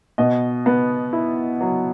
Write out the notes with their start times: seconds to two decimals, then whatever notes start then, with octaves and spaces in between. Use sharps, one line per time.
0.18 B2 D#5
0.66 B3
1.13 E4
1.61 F#3